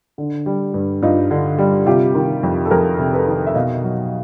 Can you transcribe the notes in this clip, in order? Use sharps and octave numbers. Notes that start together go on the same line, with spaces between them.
D3
G3
G2
G2 D#4 F4
D3
G3
C3 F4 G4
D#3
F2
A4
F2 G#4 A#4
C3
A4 B4
D#3
E5
B2 D#5 F5
F#3